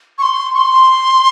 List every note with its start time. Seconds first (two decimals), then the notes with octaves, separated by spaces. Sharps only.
0.18 C#6
0.22 C6
0.54 C#6
0.58 C6